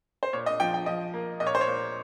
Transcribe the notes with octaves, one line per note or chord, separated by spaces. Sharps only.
C5
A#2 C#5
D#5
F3 G5
G5
F3 D#5
A#3
A#2 D#5
C#5
C5
C#5
A#2